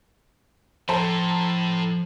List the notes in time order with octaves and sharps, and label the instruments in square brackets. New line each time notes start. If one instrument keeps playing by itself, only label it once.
[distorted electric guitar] A2 [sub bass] F3 [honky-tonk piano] A4 C5 A#5